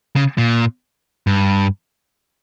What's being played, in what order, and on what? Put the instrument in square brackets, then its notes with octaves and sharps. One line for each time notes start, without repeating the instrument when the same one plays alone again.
[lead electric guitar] C#3
A#2
G2